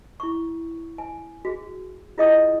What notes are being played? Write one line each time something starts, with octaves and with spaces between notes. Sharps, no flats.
E4 C#6
G#5
F#4 G#4
E4 F4 G#4 D#5 G5 D#6